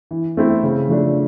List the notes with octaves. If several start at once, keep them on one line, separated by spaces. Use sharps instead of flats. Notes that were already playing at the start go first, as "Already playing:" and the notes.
E3
A3 C4 E4
C#3
F3 A3 D4